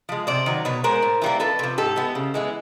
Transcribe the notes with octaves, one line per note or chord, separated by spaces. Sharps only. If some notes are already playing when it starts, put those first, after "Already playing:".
F3 G#3
C3 C5 D5
D#3 F#3
B2 B4 C#5
G#3 B3 A#4 C5
A2
E3 G3 A#3
F2 A4 B4
C3 F3
G#2 G4 A4
E3 G#3 B3
C#3
E3 G#3 B3